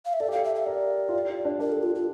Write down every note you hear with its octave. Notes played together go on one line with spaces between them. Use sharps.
F5
E5
A4 D5
G4
A4 F5
E5
E5
A#4 D5
F4
G4
F4
D4
D4 A#4
A4
F4
F4